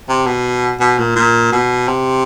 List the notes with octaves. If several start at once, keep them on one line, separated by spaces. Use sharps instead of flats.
C3
B2
B2
A#2
A#2
B2
C3